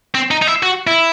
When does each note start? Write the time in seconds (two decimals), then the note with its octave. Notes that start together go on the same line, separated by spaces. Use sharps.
0.15 C4
0.31 D#4
0.42 D#4
0.47 E4
0.63 F#4
0.87 E4